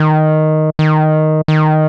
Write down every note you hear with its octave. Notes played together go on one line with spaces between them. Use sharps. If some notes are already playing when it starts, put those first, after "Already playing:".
Already playing: D#3
D#3
D#3